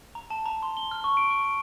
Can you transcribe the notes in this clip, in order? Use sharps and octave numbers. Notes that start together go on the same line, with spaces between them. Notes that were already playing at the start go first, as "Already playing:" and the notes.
A#5
A5
A#5
C6
G7
F6
C#6
D7
C#6
D7